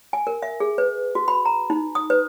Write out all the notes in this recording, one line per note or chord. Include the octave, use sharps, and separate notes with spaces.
G#5
A#4
E5
G#4
B4
F#4
B5
A#5
D#4
D#6
B4